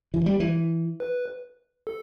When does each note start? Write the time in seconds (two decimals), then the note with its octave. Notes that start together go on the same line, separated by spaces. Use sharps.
0.14 E3
0.26 G3
0.40 E3
1.00 B4
1.87 A4